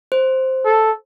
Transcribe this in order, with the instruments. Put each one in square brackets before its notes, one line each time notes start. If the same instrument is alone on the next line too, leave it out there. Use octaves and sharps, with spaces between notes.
[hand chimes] C5
[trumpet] A4